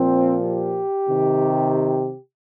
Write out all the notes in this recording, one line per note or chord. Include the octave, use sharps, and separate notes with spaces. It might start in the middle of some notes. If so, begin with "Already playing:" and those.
Already playing: A#2 F3 C4
G4
C3 D#3